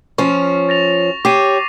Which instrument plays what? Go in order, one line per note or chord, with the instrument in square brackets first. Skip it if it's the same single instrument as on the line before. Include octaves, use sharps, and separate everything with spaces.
[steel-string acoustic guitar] F3 C#4 [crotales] C#6
[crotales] A6 A#6 F7
[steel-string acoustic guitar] G4 C#5 [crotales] D6 C7 D#7